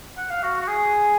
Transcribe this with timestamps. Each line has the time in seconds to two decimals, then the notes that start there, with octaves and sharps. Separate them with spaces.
0.17 F#5
0.30 F5
0.43 F#4
0.60 F#4
0.67 G#4